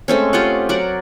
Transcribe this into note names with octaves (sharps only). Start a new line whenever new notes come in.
G#3 A3 C4 C#4
F4 G4 D#5 F#5
F#3 A#4 D5 F#5